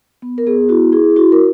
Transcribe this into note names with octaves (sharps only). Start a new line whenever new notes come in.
B3
A#4
B3 G#4
E4 F#4
E4 G#4
E4 F#4
A#4